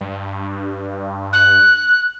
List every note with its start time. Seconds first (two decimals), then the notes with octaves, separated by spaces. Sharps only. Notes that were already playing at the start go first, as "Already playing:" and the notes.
0.01 G2
1.33 F#6